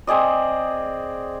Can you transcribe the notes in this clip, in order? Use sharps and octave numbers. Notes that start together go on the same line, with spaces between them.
C4 G#4 D5 D#5